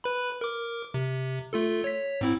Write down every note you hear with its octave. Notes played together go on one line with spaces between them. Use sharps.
B4 B5
A#4 D6
C3
A3 F4 A4
C#5 B6
G#2 C4 E4